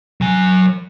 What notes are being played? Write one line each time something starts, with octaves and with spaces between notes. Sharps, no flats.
F#3 G#5